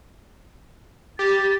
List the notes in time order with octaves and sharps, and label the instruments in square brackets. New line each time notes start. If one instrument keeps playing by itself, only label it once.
[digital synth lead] G4 [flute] A6